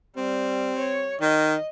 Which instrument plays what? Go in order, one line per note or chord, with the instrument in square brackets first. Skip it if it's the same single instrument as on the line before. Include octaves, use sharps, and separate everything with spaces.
[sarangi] G3 [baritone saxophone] C4
[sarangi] C#5
[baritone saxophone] D#3 [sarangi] D#5